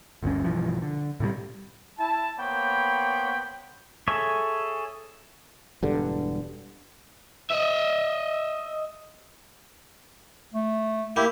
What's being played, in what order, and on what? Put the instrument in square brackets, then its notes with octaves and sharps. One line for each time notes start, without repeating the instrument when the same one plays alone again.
[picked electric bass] G1 D2 G2 C#4
B1 G2 E3 F3
D3
A2 C3 D#3 G3
[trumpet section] E4 A5
A#3 B3 C5 C#5 G5 B5
[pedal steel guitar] G#4 A4 C#5 E5
[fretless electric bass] E1 G2 D3
[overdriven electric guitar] D#5 E5
[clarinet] A3
[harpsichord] A#3 [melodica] E4 G4